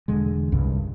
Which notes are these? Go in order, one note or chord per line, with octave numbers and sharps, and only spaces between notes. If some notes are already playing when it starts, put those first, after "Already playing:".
E1 D3 G#3
C2 G2 C#3